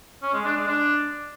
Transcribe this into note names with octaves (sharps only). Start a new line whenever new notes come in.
C#4
G#3
D4
G#3
D4